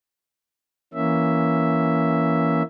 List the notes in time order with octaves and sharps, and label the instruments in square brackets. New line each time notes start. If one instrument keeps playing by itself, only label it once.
[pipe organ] E3 A#3 C#4 E5